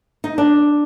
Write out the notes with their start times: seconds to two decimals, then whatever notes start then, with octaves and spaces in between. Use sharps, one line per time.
0.24 D#4
0.38 D4